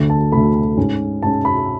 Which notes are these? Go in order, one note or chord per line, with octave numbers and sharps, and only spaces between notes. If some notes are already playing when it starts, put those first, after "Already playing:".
Already playing: D2 D3 A3
A5
D2 D3 A3 B5
G#2 G#3 C#4
G#2 G#3 C#4 A5
B5